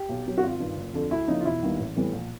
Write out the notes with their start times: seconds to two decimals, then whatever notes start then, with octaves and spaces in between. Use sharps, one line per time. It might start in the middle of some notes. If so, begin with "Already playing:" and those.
Already playing: G4
0.09 B1
0.26 B2 F#3
0.38 F#4
0.43 G#1 F4
0.60 G2 D#3
0.77 F#1
0.94 F2 D3
1.11 D2 E4
1.28 C#3 F3 A#3 D#4
1.40 F4
1.45 E1 E4
1.62 D#2 D#3 G3 B3
1.79 A1
1.96 A2 E3 G3 B3
2.13 A#1